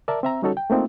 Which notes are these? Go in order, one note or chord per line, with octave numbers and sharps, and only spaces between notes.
A#4 D5 E5 A5
C4 E5 A#5
G3 C#4 D#4 F#4 A4 C#5
G5
A3 A#3 C4 D#4 F4